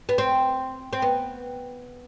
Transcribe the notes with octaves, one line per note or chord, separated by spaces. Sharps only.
B3
C4
C4
B3